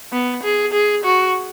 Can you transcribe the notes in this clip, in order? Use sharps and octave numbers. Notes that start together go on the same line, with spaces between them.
B3
G#4
G#4
F#4